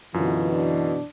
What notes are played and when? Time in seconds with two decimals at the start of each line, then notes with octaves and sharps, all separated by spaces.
0.14 F#2 B2 D3 E3 F4
0.53 D4